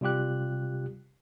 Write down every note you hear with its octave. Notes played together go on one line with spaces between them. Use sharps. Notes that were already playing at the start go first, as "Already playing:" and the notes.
C3 G3 F4 G4 F#6